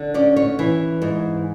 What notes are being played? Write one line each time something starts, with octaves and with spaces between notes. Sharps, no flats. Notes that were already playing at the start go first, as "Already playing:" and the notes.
Already playing: D3
C#4 D5
C#5
E3
G#2